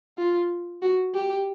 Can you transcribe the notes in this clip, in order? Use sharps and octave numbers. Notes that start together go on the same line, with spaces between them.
F4
F#4
G4